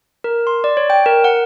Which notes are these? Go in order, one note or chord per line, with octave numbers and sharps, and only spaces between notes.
A#4
C6
D5
C#5
G5
A#4
F#5